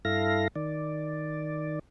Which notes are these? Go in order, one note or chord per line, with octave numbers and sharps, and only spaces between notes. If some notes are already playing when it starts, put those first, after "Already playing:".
G2 E4 A4 F5 A#6
D#3 D5